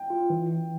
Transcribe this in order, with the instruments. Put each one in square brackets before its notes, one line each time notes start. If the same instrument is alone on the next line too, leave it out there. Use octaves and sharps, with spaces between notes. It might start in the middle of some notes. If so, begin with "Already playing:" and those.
Already playing: [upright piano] G5
[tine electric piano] F4
E3